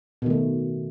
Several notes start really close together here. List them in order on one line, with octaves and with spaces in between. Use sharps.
B2 D#3 A3